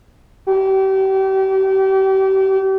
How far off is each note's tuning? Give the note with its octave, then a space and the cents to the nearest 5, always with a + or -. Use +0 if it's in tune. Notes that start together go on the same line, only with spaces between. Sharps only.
G4 -35